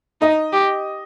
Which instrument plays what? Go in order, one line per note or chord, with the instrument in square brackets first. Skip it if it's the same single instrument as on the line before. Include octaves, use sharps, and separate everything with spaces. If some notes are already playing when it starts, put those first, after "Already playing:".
[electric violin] D#4 [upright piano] D#5
[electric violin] G4